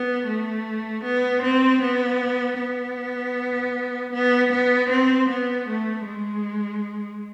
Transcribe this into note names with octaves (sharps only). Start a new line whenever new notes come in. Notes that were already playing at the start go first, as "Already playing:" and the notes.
Already playing: B3
A3
B3
C4
B3
B3
B3
B3
C4
B3
A3
G#3